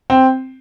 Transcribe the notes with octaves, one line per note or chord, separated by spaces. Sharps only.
C4